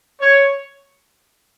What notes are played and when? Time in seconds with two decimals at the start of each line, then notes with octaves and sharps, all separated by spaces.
0.20 C#5